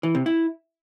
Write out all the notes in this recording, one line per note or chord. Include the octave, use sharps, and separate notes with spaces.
E3
C3
E4